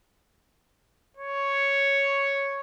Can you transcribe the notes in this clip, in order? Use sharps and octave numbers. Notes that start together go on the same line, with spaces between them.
C#5